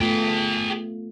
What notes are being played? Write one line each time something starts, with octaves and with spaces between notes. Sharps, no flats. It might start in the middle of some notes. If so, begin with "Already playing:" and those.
A3 B3 F4 G#4 G5